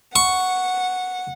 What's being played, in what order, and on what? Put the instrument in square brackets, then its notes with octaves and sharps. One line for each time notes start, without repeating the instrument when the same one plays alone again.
[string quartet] F#5 [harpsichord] C#6